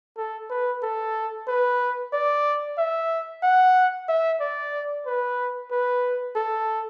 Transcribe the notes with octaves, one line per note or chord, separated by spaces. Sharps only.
A4
B4
A4
B4
D5
E5
F#5
E5
D5
B4
B4
A4